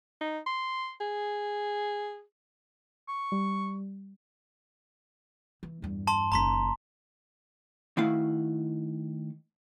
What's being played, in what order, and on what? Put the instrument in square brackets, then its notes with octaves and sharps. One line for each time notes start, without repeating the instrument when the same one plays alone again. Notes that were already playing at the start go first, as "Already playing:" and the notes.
[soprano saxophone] D#4
C6
G#4
[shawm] C#6
[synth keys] G3
[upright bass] E3
E2 G2
[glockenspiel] A5 C6
[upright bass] F#1 D#3 [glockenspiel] A#5 C6 B6
[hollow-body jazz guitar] D#3 A3 E4 F#4 F5